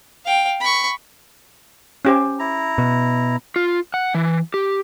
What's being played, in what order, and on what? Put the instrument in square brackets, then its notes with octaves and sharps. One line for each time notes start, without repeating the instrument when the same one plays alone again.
[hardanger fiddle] F5 G5
B5 C#6
[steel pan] C#4 G4 C5
[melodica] E4 A#5
[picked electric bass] B2
[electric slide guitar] F4
F#5
E3
G4